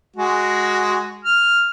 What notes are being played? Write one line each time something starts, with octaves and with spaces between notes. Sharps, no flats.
G#3 F#4
F6